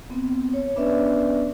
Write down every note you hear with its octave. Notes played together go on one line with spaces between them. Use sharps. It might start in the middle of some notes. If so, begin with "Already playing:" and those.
B3 C4
C#5
B3 C#4 D4 B4 D5 E5